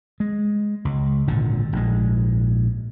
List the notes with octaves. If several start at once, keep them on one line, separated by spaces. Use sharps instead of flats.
G#3
C#2
G#1 A#2 D3
A#1 G#2 G#3